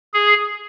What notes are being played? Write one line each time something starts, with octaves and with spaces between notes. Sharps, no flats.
G#4